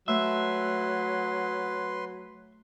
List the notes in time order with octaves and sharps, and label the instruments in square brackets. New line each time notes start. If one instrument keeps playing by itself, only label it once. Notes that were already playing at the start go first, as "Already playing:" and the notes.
[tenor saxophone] F#3 [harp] A3 [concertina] B4 C6 [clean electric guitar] E5